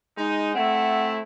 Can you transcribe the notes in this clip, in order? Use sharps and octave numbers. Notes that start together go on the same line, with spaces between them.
G#3 D#4
A3 C4 E4 F#5